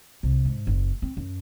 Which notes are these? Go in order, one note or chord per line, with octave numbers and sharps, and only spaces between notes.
C2
G#2
F#1
C4
F#2